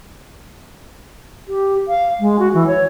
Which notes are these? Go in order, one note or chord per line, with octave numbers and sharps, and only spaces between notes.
G4
F5
G#3
F#4
E3
C#5